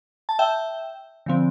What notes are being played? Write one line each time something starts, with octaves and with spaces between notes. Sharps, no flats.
A5
E5 G5
D3 F3 C4